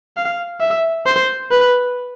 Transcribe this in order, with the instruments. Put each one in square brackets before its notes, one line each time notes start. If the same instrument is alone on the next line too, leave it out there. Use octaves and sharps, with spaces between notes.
[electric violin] F5
E5
C5
B4